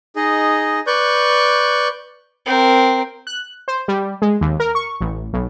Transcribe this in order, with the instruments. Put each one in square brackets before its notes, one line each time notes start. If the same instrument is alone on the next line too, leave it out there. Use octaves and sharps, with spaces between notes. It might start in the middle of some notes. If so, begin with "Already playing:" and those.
[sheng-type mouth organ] D#4 G#4 D#5
B4 D5 C#6 F#6 G6
[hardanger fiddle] C4 A#4
[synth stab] F#6
C5
G3
G#3
D#2
A#4
C#6
A1
B1